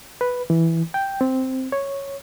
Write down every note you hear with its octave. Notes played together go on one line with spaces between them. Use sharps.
B4
E3
G5
C4
C#5